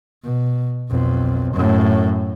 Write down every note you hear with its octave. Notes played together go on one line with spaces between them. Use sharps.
B2
B1 F2
F#2 A2